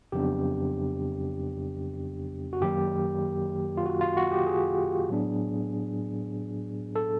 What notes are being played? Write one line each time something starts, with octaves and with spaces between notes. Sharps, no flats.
F2 C#3 F#3 B3 D4 G4
F#4
F#2 D#3 F#3 A#3 G4
F4
F#4
F4
F#4
G4
G#4
A2 F#3 B3 D4
A4